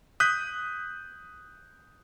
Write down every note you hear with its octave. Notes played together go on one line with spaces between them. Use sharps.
D#6 F#6 G6 B6